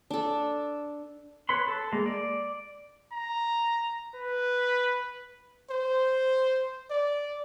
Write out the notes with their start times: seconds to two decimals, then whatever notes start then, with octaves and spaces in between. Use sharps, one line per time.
0.11 D4 A4
1.49 B4 C#5 B5 C6
1.68 A4
1.92 G#3 A#3
2.06 D5
3.13 A#5
4.16 B4
5.70 C5
6.90 D5